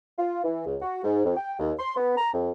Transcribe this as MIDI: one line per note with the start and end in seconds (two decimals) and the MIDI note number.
0.18 0.40 65
0.44 0.62 52
0.66 0.76 37
0.81 1.00 66
1.04 1.23 44
1.24 1.34 41
1.37 1.53 79
1.59 1.72 39
1.79 1.92 84
1.96 2.17 59
2.17 2.32 82
2.34 2.50 41